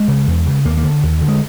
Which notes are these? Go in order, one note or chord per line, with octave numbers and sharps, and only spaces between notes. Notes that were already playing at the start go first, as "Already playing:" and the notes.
Already playing: G#3
C#3
E2
C#3
D#2 A#3
A#3
D3
D#2
D3
G#3